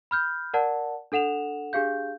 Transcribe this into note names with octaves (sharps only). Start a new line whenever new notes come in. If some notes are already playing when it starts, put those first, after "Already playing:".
B5 F6 G6
A#4 D5 F#5 A5
D4 A4 F#5 E7 F7
D4 G4 G#4 F5 G6